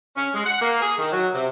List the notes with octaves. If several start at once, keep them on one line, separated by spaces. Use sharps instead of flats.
C#4
G#3
F#5
A#3
G#4
D#3
F#3
C3